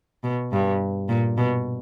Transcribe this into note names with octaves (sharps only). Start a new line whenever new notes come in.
B2
G2
A#2
B2